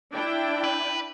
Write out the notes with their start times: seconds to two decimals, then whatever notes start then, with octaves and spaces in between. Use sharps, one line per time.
0.12 D4 E4 G5
0.64 B4